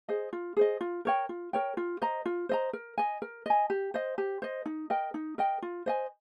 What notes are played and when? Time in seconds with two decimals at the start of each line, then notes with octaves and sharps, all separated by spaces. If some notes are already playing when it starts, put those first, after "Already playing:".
0.09 G#4 C5 D#5
0.33 F4
0.57 G#4 C5 D#5
0.81 F4
1.05 A#4 C#5 G5
1.29 F4
1.53 A#4 C#5 G5
1.77 F4
2.02 C5 D#5 A#5
2.26 F4
2.49 C5 D#5 A#5
2.73 A#4
2.98 D#5 G#5
3.22 A#4
3.46 D#5 G#5
3.70 G4
3.94 C5 D#5
4.18 G4
4.42 C5 D#5
4.66 D#4
4.90 A#4 D#5 G5
5.14 D#4
5.38 A#4 D#5 G5
5.62 F4
5.86 C5 D#5 G#5